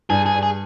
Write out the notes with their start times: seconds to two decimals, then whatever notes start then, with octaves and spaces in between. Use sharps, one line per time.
0.10 G2 G#4
0.26 G#4
0.34 G2
0.43 G#4